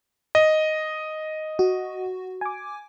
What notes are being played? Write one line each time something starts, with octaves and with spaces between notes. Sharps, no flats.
D#5
F#4
G#5 D6